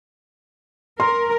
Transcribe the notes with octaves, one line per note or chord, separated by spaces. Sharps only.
A#4 C6